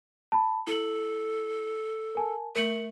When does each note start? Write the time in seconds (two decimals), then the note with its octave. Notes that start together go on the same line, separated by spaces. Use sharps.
0.32 A5 B5
0.67 E4 A4 F#7
2.15 A#4 G#5 A5
2.56 A3 A#4 C#7 F#7